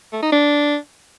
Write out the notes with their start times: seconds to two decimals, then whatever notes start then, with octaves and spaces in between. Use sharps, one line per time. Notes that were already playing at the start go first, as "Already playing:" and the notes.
0.13 A3
0.22 D#4
0.32 D4